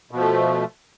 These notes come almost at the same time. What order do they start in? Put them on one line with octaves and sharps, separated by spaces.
B2 F3 A3